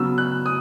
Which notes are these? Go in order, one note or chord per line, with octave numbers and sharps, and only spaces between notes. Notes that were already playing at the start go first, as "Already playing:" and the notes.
Already playing: C#3 F#3 B3 E6
F#6
D#6